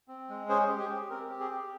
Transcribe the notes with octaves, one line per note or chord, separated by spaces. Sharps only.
C4
G#3
C#4 G#4 C5
G4
G#4
G4
C4 A#4
G4
G#4
G4